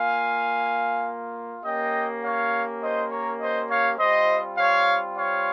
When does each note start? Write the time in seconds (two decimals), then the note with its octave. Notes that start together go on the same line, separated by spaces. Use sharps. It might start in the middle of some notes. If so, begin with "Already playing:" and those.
Already playing: A#3 F4 F5 G#5
1.64 A#3 C#4 G4 D#5 G5
2.22 C#5 F5
2.82 C5 D#5
3.11 A#4 C#5
3.40 C5 D#5
3.69 C#5 F5
3.98 G3 C4 F4 C5 D#5
4.57 C#5 F5
5.16 C#5 F5